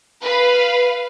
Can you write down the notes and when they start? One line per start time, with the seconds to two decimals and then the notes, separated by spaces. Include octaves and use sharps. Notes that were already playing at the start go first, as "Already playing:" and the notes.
0.23 B4 F5